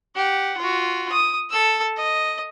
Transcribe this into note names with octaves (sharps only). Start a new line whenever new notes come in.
G4 F#5
F4 F#4
D#6
A4 E6
D#5